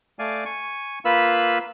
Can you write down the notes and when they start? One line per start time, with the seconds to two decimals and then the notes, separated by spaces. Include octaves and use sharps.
0.19 A3 D5 F5 G#5
0.45 G#5 C#6
1.05 A#3 F4 B4 B5 E6